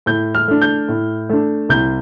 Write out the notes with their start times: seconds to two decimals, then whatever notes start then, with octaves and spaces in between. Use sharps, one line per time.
0.06 A2 G6
0.35 F6
0.48 A3 D4
0.62 G6
0.89 A2
1.29 A3 D4
1.69 C2 G6